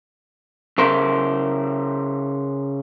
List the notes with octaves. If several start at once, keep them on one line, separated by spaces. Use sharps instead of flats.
C#3 A#4 C5